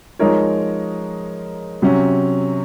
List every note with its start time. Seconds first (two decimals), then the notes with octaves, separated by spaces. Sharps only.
0.19 F3 G#3 D#4 A#4 C#5
1.82 C3 F#3 C#4